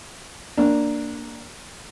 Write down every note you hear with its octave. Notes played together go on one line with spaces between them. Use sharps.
A#3 D4